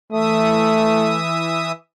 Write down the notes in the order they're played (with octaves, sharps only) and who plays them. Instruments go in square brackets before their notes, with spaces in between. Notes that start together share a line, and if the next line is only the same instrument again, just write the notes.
[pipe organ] E3 E5 D#6 [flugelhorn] A3